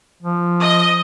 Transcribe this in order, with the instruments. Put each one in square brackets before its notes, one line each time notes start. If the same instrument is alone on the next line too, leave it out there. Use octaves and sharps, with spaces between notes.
[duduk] F3
[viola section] D#5